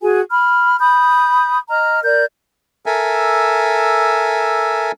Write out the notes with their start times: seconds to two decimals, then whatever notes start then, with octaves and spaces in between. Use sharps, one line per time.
0.01 F#4 G#4 G#5
0.30 B5 F6
0.80 B5 D#6 G6
1.69 D#5 A#5 F6
2.04 A#4 D5 G6
2.86 A4 A#4 E5 G#5